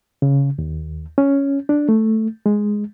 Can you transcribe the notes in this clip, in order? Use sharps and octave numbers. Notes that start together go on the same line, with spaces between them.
C#3
D#2
C#4
D4
A3
G#3